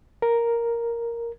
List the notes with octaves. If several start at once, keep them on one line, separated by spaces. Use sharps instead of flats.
A#4